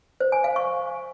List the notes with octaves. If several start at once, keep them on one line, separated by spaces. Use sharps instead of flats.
C5
G#5
F5
C#6